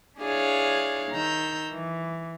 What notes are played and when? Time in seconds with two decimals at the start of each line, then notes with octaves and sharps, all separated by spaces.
0.20 D4 E4 G#4 C#5 F5
1.11 D#3 A#5 E6 G6
1.71 E3